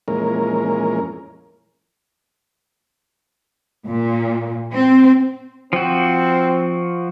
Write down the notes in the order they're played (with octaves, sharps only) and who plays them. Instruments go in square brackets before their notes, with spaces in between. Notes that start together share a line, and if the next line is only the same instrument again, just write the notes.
[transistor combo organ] F2 A#2 E3 G#3 C#4 A#4
[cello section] A#2
C4
[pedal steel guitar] F3 F#4 [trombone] C4